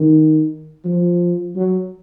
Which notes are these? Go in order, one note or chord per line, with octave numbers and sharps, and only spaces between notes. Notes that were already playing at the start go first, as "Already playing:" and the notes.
Already playing: D#3
F3
F#3